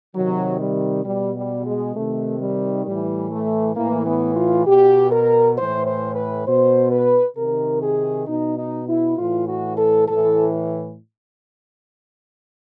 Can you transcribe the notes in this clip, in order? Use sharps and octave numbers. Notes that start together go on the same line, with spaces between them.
C3 D#3 F#3
G3
B2 G3
G3
G#3
C3 D#3 A3
G3
A2 E3 G3
A3
A2 E3 A#3
B3
F4
B2 G4
A#4
A2 E3 C5
C5
B4
B2 C5
B4
C3 D#3 A#4
G#4
B2 D#4
D#4
E4
A2 E3 F4
F#4
A4
A2 E3 A4